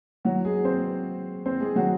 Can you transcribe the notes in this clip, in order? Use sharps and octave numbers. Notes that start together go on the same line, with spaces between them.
F#3 F#4
G#3 G#4
C4 C5
C4 C5
G#3 G#4
F#3 F#4